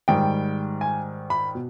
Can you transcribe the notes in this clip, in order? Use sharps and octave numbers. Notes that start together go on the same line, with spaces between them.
G#2 D#3 G3 G5
G#5
B5
B2